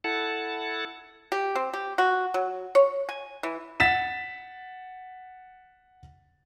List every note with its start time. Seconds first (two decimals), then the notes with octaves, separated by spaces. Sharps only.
0.04 E4 A4 F#5 A5
1.32 G4
1.55 C4
1.73 G4
1.98 F#4
2.34 F#3
2.75 C#5
3.09 G#5
3.43 E3
3.80 F#5 A6 B6 E7